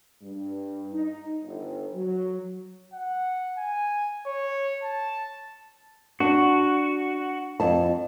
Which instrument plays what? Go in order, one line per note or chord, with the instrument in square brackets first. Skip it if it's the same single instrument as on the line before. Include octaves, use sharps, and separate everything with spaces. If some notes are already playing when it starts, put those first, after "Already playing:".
[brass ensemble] G2
D#4
G1
F#3
[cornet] F#5
G#5
C#5
A5
[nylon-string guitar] D4 [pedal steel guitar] F#4
[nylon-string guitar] F2 A5